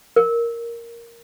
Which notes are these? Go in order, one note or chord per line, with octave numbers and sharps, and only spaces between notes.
A#4